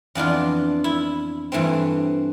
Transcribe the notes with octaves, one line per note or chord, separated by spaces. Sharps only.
F2 E3 B3 D4 F4
E4
G2 E3 A3 C4